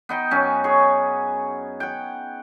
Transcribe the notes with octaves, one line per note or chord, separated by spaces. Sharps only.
B3 D#4 G5
F#2 C#4
G#4 C#5
F#5 G5